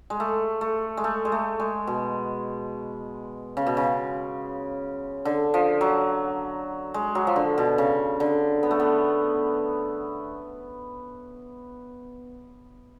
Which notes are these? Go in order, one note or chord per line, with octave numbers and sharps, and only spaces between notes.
G#3
A3
A3
G#3
A3
G#3
A3
G#3
B2
C#3
B2
C#3
D3
F3
F#3
G#3
F#3
F3
D3
B2
C#3
D3
B3
A3
B3